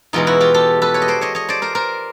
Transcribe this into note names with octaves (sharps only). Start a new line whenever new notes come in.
E2 B2 G#3 D#4 F4
E4 F#4
F4 G4
G4 A4
A4 B4
B4 C#5
D#5
C5 D5
C#5 D#5
C#5 D#5
C5 D5
A#4 C5
A#4 C5